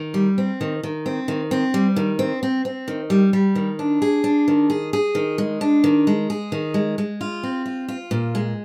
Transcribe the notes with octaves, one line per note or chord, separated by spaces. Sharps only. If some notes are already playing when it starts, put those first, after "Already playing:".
Already playing: D#3
G3
C4
D#3
D#3
C4
D#3
C4
G3
D#3
C4
C4
C4
D#3
G3
G3
D#3
D4
G#4
D4
D#3
G#4
G#4
D#3
G#3
D4
D#3
G#3
G#4
D#3
G#3
G#3
F4
C4
F4
F4
A#2
G#3